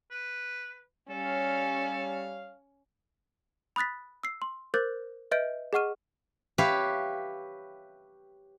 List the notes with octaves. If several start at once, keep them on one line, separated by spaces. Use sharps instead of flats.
B4
G3 C#4 A4 C#5 F5
B5 D#6 F#6 A6 B6
E6 C7
C6
A#4 C5 D6 F#6 G6 A6
B4 D#5 E5 G6 D7
G#4 D#5 F#5 C#6 F6 D#7
G4 B4 C#5 E5 F5